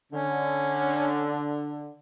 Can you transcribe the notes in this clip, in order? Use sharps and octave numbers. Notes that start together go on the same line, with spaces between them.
D3 C#4